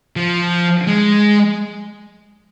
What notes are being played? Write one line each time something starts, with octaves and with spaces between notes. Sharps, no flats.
F3
G#3